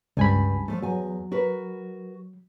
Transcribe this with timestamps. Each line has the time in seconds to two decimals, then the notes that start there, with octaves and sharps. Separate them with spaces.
0.17 C#2 G2 G#5 B5
0.68 F3 A3
0.82 E2 F#3 G#5
1.32 F#4 A#4 B4